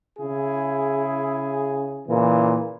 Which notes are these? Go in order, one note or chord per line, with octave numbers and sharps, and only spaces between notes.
C#3 E4 G#4
A#2 C#3 E3